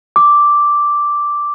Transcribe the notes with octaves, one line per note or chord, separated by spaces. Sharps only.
D6